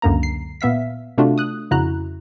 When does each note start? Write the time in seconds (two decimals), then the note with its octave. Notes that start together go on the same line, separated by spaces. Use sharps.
0.02 C#2 F#2 D3 A#3 A#5
0.23 C7
0.61 A#2 B3 E5 F5 B6
1.18 C3 A3 D4 F4 F#4
1.38 D#6 F#6
1.71 F2 C#3 E4 F#4 A#5 F#6